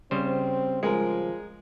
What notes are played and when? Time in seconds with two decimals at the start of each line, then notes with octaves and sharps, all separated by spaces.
0.11 C#3 G3 C4 C5
0.83 F3 G#3 A#4